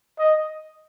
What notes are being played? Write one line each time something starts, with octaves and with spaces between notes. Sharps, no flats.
D#5